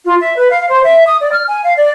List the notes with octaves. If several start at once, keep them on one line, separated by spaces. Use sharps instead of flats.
F4
E5
B4
F5
C5
E5
D#6
D5
F6
G#5
F5
D5